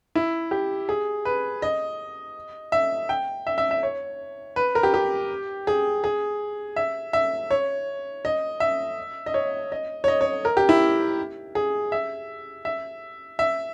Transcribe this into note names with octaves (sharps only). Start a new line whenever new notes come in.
E4
G4
G#4
B4
D#5
E5
G5
E5
E5
E5
C#5
B4
A#4
G4
G4
G#4
G#4
E5
E5
C#5
D#5
E5
D#5
C#5
D#5
C#5
D#5
C#5
A#4
G4
E4
G#4
E5
E5
E5